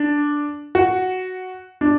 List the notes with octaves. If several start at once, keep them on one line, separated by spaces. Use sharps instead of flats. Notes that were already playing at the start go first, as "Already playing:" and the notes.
Already playing: D4
F#4
D4